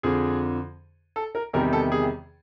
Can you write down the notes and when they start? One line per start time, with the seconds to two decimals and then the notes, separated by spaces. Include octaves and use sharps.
0.03 F2 D3 F3 G#4
1.16 A4
1.35 A#4
1.53 E2 C3 D#3 G3 A#4
1.73 A4
1.92 G#4